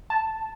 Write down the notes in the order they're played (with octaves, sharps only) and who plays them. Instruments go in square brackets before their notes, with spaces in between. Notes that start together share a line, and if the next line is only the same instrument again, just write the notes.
[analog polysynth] A5